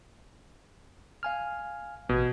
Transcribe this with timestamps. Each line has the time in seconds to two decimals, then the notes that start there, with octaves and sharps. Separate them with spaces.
1.23 F5 G#5 F6
2.09 A1 B2 G#6